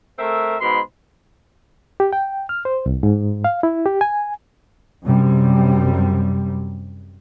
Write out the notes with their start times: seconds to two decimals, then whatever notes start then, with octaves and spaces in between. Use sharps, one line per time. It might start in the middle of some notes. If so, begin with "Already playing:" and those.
0.19 A3 C4 A#4 E5
0.60 G#2 B2 B5 C6
2.00 G4
2.13 G5
2.49 F6
2.65 C5
2.86 C2
3.03 G#2
3.44 F5
3.63 E4
3.86 G4
4.01 G#5
5.03 F#2 C3 G3